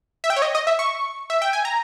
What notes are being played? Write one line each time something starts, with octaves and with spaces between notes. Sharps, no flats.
E5
G5
C#5
D#5
D#5
E5
C#6
E5
G5
G#5
A#5